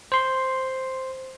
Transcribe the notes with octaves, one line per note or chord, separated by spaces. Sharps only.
C5 C6